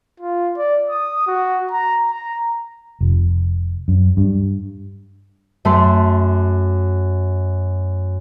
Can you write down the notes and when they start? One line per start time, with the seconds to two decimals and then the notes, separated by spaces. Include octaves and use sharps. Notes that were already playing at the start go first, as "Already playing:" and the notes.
0.20 F4
0.57 D5
0.90 D#6
1.27 F#4
1.71 A#5
2.12 A#5
3.01 F1
3.88 F#2
4.17 G2
5.65 F#2 A3 A5 C6